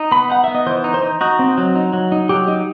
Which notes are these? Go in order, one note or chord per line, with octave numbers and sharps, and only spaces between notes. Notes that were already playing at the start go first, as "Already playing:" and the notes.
Already playing: D#4
B3 B5
D#4 F#5
B3 E5
D#5
E3 C5
D#4
C5
D#4
D#4 F#4
C4
F#3
D#4
F#3
D#4
F#3 G4
D#4